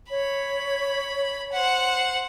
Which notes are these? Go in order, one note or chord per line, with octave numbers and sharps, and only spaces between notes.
C#5 B5
C5 F#5